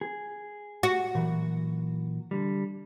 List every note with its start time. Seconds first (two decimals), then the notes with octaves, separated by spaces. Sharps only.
0.01 G#4
0.83 F#4
1.15 A#2 E3 F#3
2.31 D3 G3